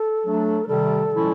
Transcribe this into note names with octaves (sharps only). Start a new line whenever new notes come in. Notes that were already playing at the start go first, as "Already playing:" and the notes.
Already playing: A4
F#3 A3 D4
A#4
C3 D#3 G3 A4
A#2 F3 G#3 C#4 E4